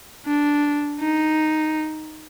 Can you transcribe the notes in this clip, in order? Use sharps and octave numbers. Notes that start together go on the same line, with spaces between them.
D4
D#4